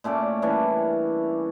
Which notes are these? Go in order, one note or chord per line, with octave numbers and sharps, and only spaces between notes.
A#2 A3 C#4 D5
E3 G3 C#4 D4